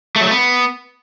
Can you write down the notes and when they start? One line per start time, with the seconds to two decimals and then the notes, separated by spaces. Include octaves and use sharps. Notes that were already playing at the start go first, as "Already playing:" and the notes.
0.16 A3
0.21 F#3
0.26 A3
0.31 B3